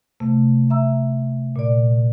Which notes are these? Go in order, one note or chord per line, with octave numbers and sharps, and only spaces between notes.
C3 A3
E5 A#5 E6
A#2 D5